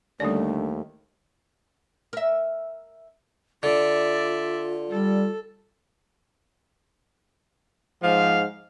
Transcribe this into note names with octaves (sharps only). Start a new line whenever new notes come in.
D#2 D3 G3 A3 C#4 D5
A#4 E5
D3 F4 D5 E5
G3 A4
G#2 F3 F5